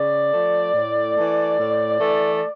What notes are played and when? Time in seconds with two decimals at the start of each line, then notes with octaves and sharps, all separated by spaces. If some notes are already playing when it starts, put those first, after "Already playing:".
Already playing: C#3 D5
0.33 F3 A3
0.75 A2
1.16 E3 A3
1.58 A2
2.00 E3 A3